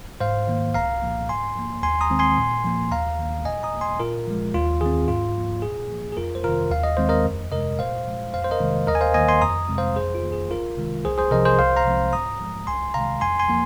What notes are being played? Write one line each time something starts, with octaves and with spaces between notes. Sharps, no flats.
G#2 C5 F5
D#3 A#3
C2 F5 A#5
A#2 F3 A#3
G#2 G#5 C6
F3 A#3
D#2 G#5 C6
A#5 D#6
D#3 G#3 C4
G#5 C6
A#2
F3 A#3
D#2 F5 A#5
D#3 A#3
A#2 D#5 G#5
A#5 D#6
A#3
G#5 C6
A#2 F4 A#4
F3 G#3
D#2 F4
D#3 C4 G#4
G#2 F4
F3 A#3
A#2 G#4
F3 A#3
G#4
F2 F4 A#4
C5
C3 D#3 F4 A#4
D#2 F5
D#5
D#3 G#3 C4 C5
A#4 D#5
F2
C3 G#3 A#4 D#5
A#2 C5 F5
F3 G#3
F2 C5 F5
C5
A#4 D#5
C3 D#3 G#3
D#2 A#4 D#5
G#5
C5 F5
D#3 A#3 D#5 G#5
G#5 C6
F2 A#5 D#6
C3 G#3 C4
C5 F5
F2 G#4 C5
F4
D#3 A#3
G#4
C2 F4 A#4
C3 D#3 G#3
C2 G#4 C5
G#4 C5
C3 F3 A#4 D#5
G#4 C5
C2 C5 F5
F5 A#5
C3 F3 G#3 C4
G#2 A#5 D#6
F3 G#3
C2 G#5 C6
C3 D#3 G#3 F5 A#5
F2 G#5 C6
G#5 C6
F3 A#3